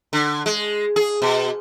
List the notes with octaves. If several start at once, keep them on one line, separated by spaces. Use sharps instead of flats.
D3
G#3
G#4
B2